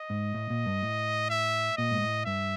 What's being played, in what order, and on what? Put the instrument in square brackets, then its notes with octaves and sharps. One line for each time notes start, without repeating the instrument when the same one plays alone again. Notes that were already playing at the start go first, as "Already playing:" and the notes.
Already playing: [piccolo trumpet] D#5
[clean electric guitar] G#2
A2
A#2
G2
A2
[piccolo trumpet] E5
[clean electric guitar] A#2 [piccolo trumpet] D#5
[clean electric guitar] G#2
A2
[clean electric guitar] G2 [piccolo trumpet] E5